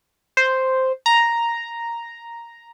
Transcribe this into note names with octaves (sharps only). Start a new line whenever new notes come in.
C5
A#5